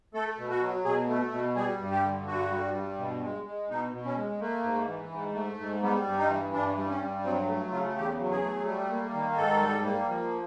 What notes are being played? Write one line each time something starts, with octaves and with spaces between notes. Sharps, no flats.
A3 A4
B2
F#4
F#3
B2 G#4
A3
B2
G3 G#4
G2
G4
D3
G2 F#4
G3
G2
B2
G#3
G#3
B2 D#4
B2
C#4
G#3
A3 A#3
G#2
E3
G#2
A3
G#2
G3 B3
G2
D#4
E3
G2 D4
G3
C#4
G2
F#3 C4
A3
C#3 F4
E2 G4
F#3
G#4
A3
G3
A#3
D#3
G#2 A4
G3
A#3
F3